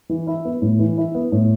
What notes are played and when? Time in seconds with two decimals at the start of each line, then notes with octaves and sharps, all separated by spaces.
0.09 E3
0.27 E4
0.45 B3
0.62 A2
0.79 E3
0.98 E4
1.15 B3
1.32 A2